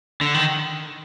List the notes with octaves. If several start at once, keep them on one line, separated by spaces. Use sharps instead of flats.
D3
D#3